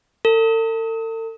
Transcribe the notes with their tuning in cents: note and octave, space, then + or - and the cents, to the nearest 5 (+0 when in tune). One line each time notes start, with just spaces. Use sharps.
A4 +40